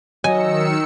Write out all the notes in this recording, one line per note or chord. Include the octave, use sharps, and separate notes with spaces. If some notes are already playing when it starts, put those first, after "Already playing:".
D#3 F#3 D#5 G#5 E6 C#7